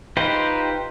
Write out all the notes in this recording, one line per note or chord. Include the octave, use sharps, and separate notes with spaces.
D#4 F4 G4 B4 C5